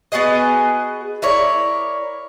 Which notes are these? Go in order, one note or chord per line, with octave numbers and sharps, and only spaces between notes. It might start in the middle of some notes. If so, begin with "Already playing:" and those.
B3 F#4 G#4 D#5
E4 A#4 C#5 D5